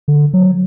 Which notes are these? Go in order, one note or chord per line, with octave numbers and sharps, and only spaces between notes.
D3
F#3